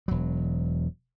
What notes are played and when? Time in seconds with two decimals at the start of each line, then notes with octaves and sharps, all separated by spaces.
0.08 E1 F#3